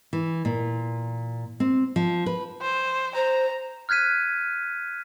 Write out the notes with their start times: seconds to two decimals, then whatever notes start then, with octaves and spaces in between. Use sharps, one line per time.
0.13 E3
0.45 A#2
1.60 C4
1.96 F3
2.26 B4
2.61 C5
3.15 C5 A#5
3.89 F6 F#6 G#6 B6 D#7